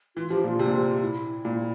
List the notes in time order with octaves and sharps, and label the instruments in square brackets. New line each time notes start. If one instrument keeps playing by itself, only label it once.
[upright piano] E3 [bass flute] F4
[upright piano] F3 [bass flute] G4
[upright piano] A#2 [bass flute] F4
[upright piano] C3
A#2
C3
[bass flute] E4
[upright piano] A#2